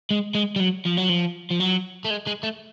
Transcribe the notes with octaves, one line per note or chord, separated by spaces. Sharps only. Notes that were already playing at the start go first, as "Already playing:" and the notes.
G#3
G#3
G3
F#3
F3
F#3
F3
F3
F#3
A3
G#3
G#3
A3